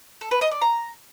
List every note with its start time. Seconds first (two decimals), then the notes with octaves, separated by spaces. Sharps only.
0.21 A4
0.31 B4
0.41 D#5
0.51 D5
0.62 A#5